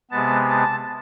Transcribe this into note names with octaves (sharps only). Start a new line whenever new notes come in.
C3 G#3 B3 A5
A5